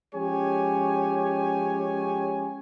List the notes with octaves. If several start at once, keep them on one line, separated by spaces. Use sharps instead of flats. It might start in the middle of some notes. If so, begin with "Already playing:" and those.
F3 G#3 C#4 G4 C#5 G#5